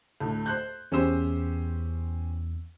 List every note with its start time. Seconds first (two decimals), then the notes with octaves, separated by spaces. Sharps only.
0.20 D2 A2
0.46 C5 F#6 G6
0.92 E2 C#4 G4 C5 E6